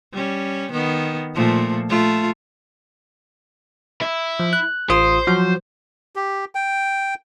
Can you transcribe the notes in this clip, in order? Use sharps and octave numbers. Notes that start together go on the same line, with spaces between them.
G3 C#4
D#3 B3
A#2 F3 A3
A3 F4
E4
F3
F#6
A1 F4 C5 D#6
F3 F#3 F#4
G4
G5